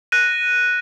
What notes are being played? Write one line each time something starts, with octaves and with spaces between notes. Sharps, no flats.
F#6 A#6 D#7